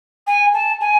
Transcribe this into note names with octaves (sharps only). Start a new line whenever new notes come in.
G#5
A5
G#5